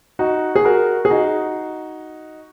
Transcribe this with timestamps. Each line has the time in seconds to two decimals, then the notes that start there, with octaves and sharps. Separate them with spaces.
0.19 D#4 F#4
0.56 G#4
0.65 F#4 A#4
1.05 G#4
1.10 D#4 F#4